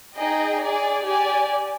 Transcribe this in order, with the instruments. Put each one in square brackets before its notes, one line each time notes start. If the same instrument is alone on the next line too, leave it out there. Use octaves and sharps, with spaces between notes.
[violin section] D#4 G#4 D#5 G5
G#4 D5 G#5
G4 D5 G#5